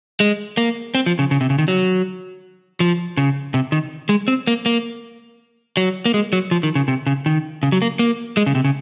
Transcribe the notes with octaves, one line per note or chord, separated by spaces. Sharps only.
G#3
A#3
C4
F3
C#3
C#3
C3
C#3
D#3
F#3
F3
C#3
C3
D#3
G#3
C4
A#3
A#3
F#3
A#3
G#3
F#3
F3
D#3
C#3
C3
C#3
D#3
C#3
F#3
A#3
A#3
G#3
C#3
C3
C#3